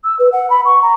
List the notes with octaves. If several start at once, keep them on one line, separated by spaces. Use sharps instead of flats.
E6
B4
F#5
B5
C#6
A#5